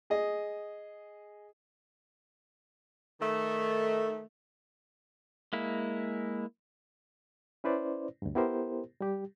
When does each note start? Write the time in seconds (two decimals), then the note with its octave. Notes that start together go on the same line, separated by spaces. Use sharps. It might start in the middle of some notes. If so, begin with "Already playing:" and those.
0.10 G#4 D#5
3.21 D#3 A3
5.53 G#3 A#3 E4
7.64 C#4 E4 B4 C5 D5
8.22 D2 G2
8.35 B3 E4 G4 A#4 C5
9.01 G3 G4